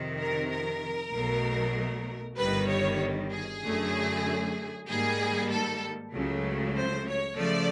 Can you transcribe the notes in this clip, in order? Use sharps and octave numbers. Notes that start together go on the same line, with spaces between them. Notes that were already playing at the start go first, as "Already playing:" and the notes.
Already playing: F2 C3 D#3
A#4
A#4
B1 B2 F#3 A3
G1 G2 D#3 G3 B4
C#5
G#4
F#2 D3 F#3 A3
G#2 D#3 G3 A#3 G#4
A4
C#2 C#3 F#3 A3
C5
C#5
C#3 F3 A3 D5